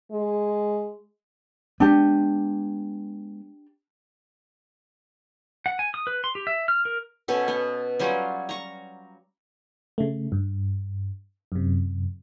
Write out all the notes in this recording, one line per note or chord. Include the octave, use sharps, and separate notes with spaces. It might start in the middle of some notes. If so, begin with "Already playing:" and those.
G#3
G#3 B3 D4 G4
F#5
G#5
D#6
B4
C6
G4
E5
F6
A#4
B2 C#4 A4
B3
F#3 G3 C#4 F4
A#5 C#6
C#3 A3
G2
F#2 C3